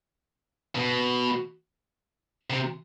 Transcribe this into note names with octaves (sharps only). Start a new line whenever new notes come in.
B2
C3